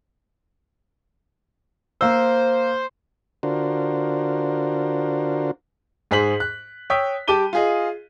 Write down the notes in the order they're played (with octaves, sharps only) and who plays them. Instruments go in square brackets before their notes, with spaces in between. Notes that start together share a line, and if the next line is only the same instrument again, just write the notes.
[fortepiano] A#3 E6 [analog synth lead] C5
[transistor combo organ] D3 D4 F4 F#4 A#4 C5
[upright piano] G#2 G#4 C5 B6 F#7
F#6
C#5 G5 D#6 E6 B6
G3 G4 A5 D6 D#7 G7
F4 G#4 D#5